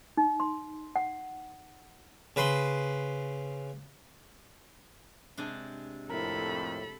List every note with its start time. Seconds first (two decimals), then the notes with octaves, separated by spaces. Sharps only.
0.17 D#4
0.40 C6
0.96 F#5
2.36 C#3 B4 B5 C6
5.37 C3 G#3 D4
6.10 F2 A2 E4 A4 A#4 B5